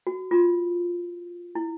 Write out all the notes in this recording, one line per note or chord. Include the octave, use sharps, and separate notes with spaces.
F#4
F4
E4